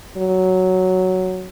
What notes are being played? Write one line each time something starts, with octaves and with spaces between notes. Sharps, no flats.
F#3